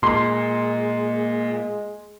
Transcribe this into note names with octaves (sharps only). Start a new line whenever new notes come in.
A#2 G#3 C6